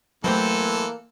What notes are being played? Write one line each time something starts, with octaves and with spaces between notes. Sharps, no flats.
B2 E3 F#3 A3 A#3 C4 G4 A4